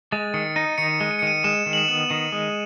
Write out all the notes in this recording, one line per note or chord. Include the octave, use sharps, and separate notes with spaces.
G#3 A6
D#3 C#7
D#4 D#7
D#3 C#7
G#3
D#7
C#7
D#3 D#7
G#3 E7
D#3
F#7
E7
B3
D#3 D#7
G#3